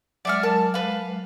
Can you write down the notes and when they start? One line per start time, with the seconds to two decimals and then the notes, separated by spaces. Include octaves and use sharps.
0.25 F#3 G#3 D5 E5 F6
0.43 A#4 A5
0.74 B4 F5